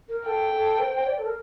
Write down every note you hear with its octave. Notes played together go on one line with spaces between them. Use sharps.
A#4
A4 G5
A4
C5
C5
D5
A4
A#4